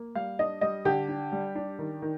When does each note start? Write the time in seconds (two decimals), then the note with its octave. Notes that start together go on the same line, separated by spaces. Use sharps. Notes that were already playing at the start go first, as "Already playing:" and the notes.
Already playing: A#3
0.15 G3 F5
0.39 D4 D#5
0.61 G3 D#5
0.85 D3 G4
1.09 D4
1.32 G3
1.55 D4
1.79 D#3
2.02 D#3